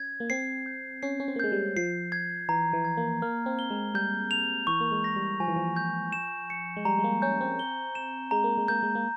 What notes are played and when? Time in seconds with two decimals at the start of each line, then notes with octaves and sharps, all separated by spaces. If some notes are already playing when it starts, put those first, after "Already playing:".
Already playing: C#4 G#6
0.20 A#3
0.30 C4 C7
0.66 G6
1.03 C#4 C7
1.20 C#4
1.28 C4
1.36 A#3
1.39 G#3 G6
1.52 G3
1.76 F3 C7
2.12 G#6
2.49 E3 A#5
2.73 E3
2.85 G#6
2.97 A#3
3.22 A#3 F6
3.46 C4
3.59 G7
3.70 G#3
3.94 G3 G6
4.31 F7
4.67 E3 C#6
4.80 A#3
4.91 G#3
5.04 A#6
5.16 G3
5.40 F3 G#5
5.48 E3
5.56 F3
5.76 G6
6.12 E7
6.50 C#7
6.77 G#3
6.85 G3 A#5
6.99 G#3
7.04 A#3
7.22 C#4 G6
7.41 C4
7.59 G7
7.95 E7
8.31 G#3 A#5
8.44 A#3
8.57 G#3
8.68 A#3 G6
8.83 G#3
8.95 A#3